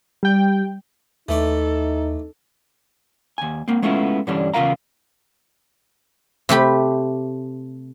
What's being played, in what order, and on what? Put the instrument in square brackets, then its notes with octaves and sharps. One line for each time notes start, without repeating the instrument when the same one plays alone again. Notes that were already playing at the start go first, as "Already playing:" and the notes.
[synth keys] G3 G5
[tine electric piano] D#2 [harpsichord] E3 A3 D5 [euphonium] D#4 [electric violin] A4
[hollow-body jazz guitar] D#2 G#5
A#3 C4
G#3 A3 B3 C#4 E4 F4
G2 D3 E3 G3 C#4 D4
E2 C#3 F4 A#4 F5 A#5
[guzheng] C3 A3 G4 B5